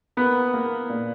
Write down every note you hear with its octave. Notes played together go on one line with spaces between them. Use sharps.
A#3 B3 B4
A#3
A#2